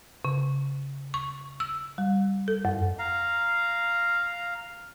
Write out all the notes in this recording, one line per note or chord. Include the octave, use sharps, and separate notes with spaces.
C#3
C#6
E6
G3
A4
F#2
F5 A#5